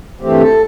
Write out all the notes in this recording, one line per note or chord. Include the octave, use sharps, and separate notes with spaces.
G2 E3 A3 C4 G4
A4